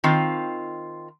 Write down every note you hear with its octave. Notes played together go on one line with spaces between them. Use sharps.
D#3 C4 F4